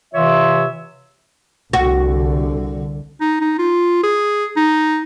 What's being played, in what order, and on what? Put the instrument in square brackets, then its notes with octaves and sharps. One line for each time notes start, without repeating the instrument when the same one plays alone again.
[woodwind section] C3 E3 F4 C#5 E5 E6
[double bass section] C2 D3 [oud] F#4
[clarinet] D#4
D#4
F4
G#4
D#4